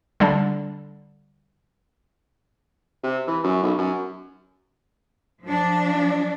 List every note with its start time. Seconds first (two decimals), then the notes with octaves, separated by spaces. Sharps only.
0.20 D3 G3 D4
3.04 C3
3.27 E3
3.44 F#2
3.63 B1
3.78 F#2
5.42 F3 D4